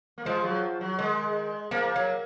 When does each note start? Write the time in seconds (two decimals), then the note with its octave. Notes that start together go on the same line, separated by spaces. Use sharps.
0.18 A#3
0.25 F3 G#3
0.44 F#3
0.81 F#3
0.99 D#3 G#3
1.71 F3 A#3
1.96 F#3